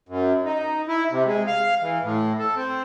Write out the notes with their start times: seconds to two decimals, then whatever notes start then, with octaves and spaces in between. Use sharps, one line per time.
0.09 F#2
0.45 D#4
0.88 E4
1.11 C3
1.26 G#3
1.47 F5
1.82 E3
2.03 A2
2.39 A4
2.56 C4